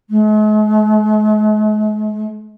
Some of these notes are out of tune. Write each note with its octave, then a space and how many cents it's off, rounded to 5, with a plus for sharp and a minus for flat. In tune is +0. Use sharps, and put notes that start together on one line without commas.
G#3 +45